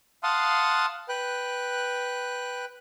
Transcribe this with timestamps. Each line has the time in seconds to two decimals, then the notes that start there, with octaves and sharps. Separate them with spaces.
0.23 F5 F#5 A5 C6 D#6
1.09 B4 G5 F#6